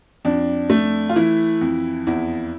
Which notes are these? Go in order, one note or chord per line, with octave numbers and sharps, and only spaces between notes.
F2 D4
A3
F4
E3 E4
F2
E2 E4